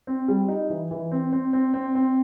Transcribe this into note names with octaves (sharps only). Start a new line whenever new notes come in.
C4
G3
D#4
E3
E3
C4
C4
C4
C4
C4